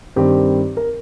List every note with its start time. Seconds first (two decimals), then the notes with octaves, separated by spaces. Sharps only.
0.16 G2 D#3 G3 C4 G4
0.77 A#4